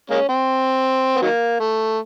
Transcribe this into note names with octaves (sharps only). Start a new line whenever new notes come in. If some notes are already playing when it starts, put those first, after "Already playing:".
G#3 A#3 C#4
C4
B3
D#3 F#3 A#3
A3